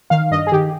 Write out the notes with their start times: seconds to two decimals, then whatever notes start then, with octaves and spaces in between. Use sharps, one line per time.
0.10 D#3 F5
0.31 G2 D#5
0.47 G#4
0.52 D#3 G4